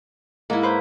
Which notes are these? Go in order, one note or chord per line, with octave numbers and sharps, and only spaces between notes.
G#2 A#3 E4
B4 C5